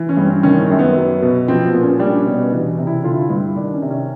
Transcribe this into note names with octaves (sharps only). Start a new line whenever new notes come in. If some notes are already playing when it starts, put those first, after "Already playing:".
Already playing: E3
C#4
G2
C4
D#3 C#4
C4
F#2
B3
F#3
B2
F3 C4
B3
A#2
C#4
G3 D4
C#4
B2
B3
E3 D4
C3
E4
D3 F4
F4
E4
G2
D#3 D4
C#4
C3
C#4